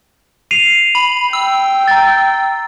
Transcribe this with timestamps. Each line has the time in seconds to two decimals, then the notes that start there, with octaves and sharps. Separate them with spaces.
0.51 C7 D#7 F7
0.95 B5
1.33 G5 E6
1.88 A#5 A6